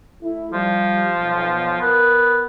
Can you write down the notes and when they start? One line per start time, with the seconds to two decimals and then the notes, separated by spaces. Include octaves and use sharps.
0.23 A3 E4
0.53 F3 G3
1.18 B1
1.81 B3 A#4